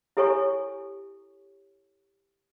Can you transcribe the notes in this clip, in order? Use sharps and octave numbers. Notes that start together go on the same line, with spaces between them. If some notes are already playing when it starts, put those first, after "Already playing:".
E4 G4 A4 C#5 G#5 C#6